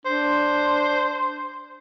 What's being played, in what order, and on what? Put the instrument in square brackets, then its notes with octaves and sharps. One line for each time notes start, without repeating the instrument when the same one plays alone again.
[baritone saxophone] D4 [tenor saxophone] C5